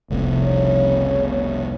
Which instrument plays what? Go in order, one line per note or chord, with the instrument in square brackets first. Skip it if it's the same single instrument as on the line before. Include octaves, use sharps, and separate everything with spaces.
[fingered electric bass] F1 C2
[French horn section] C#3 C#5